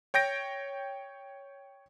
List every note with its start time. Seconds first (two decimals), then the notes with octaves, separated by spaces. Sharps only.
0.14 C#5 G5 G6 A#6 D7